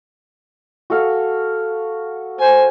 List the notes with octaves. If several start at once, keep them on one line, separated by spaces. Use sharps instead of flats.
F#4 A4 F5
C5 G#5